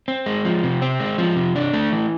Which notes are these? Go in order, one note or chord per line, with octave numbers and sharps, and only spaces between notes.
C4
G#3
F3
C3
C4
G#3
F3
C3
D4
A3
E3